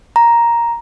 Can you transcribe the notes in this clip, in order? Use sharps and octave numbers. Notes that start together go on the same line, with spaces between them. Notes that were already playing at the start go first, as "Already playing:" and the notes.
A#5